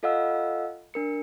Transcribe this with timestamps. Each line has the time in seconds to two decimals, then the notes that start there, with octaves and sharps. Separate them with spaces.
0.03 F4 A4 D#5 F5 F#5 E6
0.94 D4 A#4 C#7